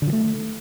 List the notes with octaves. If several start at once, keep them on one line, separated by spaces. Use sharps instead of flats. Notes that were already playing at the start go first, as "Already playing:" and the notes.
D3
F3
A3